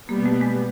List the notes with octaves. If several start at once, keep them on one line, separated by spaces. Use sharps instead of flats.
B2 G3 A#3 B3
A3
G#3